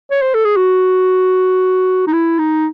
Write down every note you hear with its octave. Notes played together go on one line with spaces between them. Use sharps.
C#5
C5
A4
G#4
F#4
D#4
E4
D#4